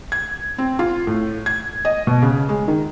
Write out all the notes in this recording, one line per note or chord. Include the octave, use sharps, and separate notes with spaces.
G#6
C4
F4
A2
G#6
D#5
B2
C#3
G#3
D#3